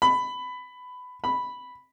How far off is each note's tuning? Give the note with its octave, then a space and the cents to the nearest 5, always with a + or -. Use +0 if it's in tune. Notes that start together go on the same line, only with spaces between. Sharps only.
B5 +15
B5 +0